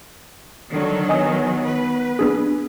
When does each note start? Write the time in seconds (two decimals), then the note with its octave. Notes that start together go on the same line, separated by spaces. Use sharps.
0.72 D3 D#3 F#3
1.09 B3 D#5 G#5 D#6
1.68 B4
2.19 B3 D4 G#4